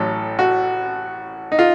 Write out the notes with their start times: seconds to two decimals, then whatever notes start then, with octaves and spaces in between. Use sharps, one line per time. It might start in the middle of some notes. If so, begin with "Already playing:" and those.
Already playing: A1 A2 F#3 A4
0.39 F#4
1.52 D#4
1.59 F4